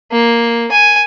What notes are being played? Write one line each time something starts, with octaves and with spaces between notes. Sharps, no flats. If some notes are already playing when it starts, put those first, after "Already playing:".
A#3
G#5